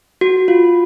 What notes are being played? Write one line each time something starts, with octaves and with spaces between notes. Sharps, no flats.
F#4
F4